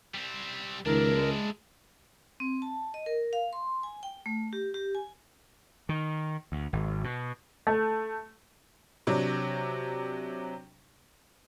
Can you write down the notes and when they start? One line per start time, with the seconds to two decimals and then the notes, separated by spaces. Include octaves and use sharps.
0.14 G3 C4
0.86 C#2 D#3 D4 E4 A#4
1.14 G#3
2.40 C4
2.62 A5
2.94 D#5
3.06 A#4
3.33 F5
3.53 C6
3.83 G#5
4.03 G5
4.26 A3
4.53 G4
4.74 G4
4.95 G#5
5.89 D#3
6.52 D2
6.73 G#1
7.04 B2
7.67 A3
9.07 C3 F#3 D4